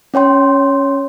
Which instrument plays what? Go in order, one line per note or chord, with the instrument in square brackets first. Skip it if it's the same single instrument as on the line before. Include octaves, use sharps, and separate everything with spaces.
[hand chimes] C#4 C#5 G5 C6